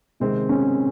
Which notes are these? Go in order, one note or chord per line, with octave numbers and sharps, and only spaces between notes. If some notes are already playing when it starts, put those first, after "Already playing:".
C3 D#3 G#3 C4
C#4